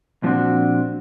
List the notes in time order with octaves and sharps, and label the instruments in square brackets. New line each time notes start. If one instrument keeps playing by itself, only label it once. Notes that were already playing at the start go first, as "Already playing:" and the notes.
[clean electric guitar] A#2 F3 B3 C4 D4 F#4